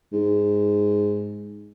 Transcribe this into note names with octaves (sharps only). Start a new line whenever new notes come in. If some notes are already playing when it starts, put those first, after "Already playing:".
G#2